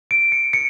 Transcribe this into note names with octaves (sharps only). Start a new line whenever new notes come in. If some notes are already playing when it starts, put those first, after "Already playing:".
D7
C#7
C#7